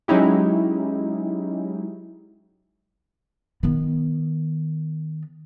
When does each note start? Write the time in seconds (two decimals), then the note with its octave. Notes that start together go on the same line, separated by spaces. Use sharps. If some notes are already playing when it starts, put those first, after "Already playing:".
0.08 F#3 G#3 C#4 D#4 E4 G4
3.63 D#3 B3